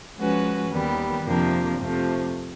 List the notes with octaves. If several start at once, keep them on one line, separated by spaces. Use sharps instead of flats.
F3 G#3 C#4 F#4 B4
D#2 D#3 G3 B3
F2 C3 F3 A#3 D4
F2 C3 F3 A3